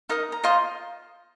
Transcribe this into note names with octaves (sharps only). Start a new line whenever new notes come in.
D#4 A#4 D#5 D#6
A#5
F4 C5 D#5 C6